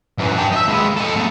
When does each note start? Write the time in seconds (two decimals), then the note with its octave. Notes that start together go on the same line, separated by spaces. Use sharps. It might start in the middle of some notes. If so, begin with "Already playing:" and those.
0.18 F#2 E3
0.36 D4 G4
0.52 D#5 E5
0.68 G#3 B4
0.97 A4 D#5
1.16 A3 B3